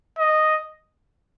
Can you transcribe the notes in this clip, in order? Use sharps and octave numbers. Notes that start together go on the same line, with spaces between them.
D#5